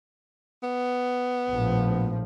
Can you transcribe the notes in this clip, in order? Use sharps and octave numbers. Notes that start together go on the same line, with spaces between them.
B3
A#1 A2 F3